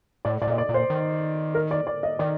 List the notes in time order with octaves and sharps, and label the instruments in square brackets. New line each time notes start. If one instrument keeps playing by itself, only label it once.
[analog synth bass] A2 [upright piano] D5
[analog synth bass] A2 [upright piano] D5
[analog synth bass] A#2 [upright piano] D#5
[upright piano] D5
[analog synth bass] A#2
[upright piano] C5
[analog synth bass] D#3
[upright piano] A#4
D5
D5
D#5
[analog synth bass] D#3 [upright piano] D5